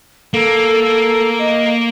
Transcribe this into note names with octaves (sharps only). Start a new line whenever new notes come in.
A#3 A4
D#5